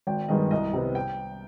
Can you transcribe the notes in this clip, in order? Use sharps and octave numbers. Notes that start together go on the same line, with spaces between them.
G#1 G5
G2 D#3 G#3 B3 D#5
C2 D#5
C3 G3 B3
G5